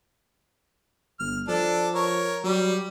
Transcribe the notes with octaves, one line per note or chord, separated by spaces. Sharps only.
G1 F6
F3 D4 A4
A#4 C#5
F#3 G3